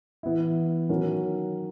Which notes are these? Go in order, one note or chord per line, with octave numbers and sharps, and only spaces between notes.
E3 B3 E4
D#3 F#3 C#4 F#4 A#4